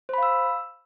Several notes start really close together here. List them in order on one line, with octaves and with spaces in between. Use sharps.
C5 B5 F5 E6